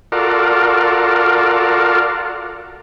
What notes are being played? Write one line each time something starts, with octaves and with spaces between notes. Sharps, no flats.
F4 F#4 A4 A#4 D5